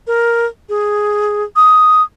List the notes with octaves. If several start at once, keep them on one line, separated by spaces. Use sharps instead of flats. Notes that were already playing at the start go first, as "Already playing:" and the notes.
A#4
G#4
D#6